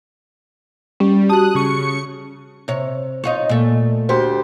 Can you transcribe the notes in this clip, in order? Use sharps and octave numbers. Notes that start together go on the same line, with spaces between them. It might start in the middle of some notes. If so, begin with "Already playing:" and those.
G3 C#4
F#4 G4 A5 D#6 F#6
C#3 C#6 C#7
C3 C#5
D#4 F4 C#5
A#2 A3
D2 G4 C5